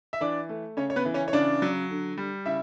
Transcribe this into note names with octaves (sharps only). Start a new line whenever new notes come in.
E5
E3 D4 D5
A3
C#3 C#4 C#5
C#5
B3 B4
E3
C#4 C#5
C#5
C#3 D4 D5
F#3
D3
G3
C#3 E4 E5